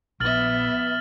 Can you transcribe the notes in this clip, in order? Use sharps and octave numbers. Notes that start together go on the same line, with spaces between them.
A#1 B3 E5 F6 A6 F#7